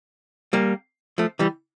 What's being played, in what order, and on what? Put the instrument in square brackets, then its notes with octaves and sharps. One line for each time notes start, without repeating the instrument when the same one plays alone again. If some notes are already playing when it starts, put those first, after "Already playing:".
[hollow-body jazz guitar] G3 A#3
F3 A3
E3 G3